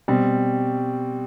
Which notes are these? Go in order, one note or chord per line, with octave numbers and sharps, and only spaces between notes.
B2 G3 C4